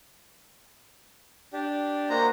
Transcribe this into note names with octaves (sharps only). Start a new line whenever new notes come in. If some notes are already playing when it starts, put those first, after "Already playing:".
D4 G4
A#3 F#4 C5 D#5 A#5